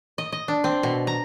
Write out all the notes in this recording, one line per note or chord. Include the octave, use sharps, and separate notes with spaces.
D#5
D#5
D4
C4
B2
A#5